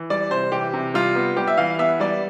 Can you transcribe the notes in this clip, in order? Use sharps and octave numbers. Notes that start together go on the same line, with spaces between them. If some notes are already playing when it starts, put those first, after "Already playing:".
Already playing: E3
G3 D5
C3 C5
E3 G4
C3
G3 F4
B3
G3 G4
E5
E3 F5
B3 E5
G3 D5